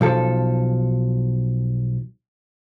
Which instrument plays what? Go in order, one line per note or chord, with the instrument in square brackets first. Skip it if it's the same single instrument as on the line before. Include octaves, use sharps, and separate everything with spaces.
[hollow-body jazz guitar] B1 F3 A4